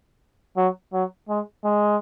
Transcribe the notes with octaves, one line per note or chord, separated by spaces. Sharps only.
F#3
F#3
G#3
G#3